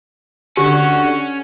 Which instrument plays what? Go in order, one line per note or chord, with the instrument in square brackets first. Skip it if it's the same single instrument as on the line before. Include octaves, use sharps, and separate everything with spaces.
[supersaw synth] D3 [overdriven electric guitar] C#4 [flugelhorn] F#4 [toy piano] G4